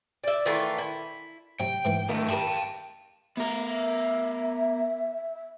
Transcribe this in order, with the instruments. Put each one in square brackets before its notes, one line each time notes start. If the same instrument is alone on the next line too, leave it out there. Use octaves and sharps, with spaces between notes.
[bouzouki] D5 E5
D#3 E3 A3 F4
E4
[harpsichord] C3 F#3 [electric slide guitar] G5
[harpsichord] G#2 E3
[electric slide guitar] D#3 A3 [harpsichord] A#3
[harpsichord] E4 G4 A#4 [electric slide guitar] G5 A5
[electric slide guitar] B3 A#4 [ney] E5